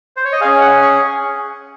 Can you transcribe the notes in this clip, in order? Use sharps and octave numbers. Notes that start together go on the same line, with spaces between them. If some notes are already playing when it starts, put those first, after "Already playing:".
C5
C#5
D#5
C#4 G#4 F5
F#5
C#6